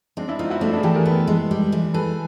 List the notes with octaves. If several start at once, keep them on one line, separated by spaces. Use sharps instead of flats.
G#3 C4 D4
D4 E4
C4 D#4 F4
E4 F#4
A3 D4 E4
D4 E4
G#4
E3 G4 A4
G#4 A#4
B3 A4 B4
G#3
G3
E3
G#4 A4 B4